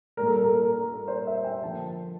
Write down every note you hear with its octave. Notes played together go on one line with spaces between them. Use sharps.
A#2 G3 A#3 A#4
A4
A#4
A4
A#4
A#4
A#4
C5
E5
G5
D3 F3 A#3 A5